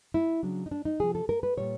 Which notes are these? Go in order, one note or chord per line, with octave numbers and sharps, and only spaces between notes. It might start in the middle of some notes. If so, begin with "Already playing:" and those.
E4
C#3 F#3 D4
D#4
D4
D#4
C3 F3 G#4
A4
A#4
B4
A#2 G3 C#5